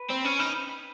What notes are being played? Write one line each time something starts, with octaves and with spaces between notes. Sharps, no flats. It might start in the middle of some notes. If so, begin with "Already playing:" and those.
Already playing: B4
C4
C#4
D#4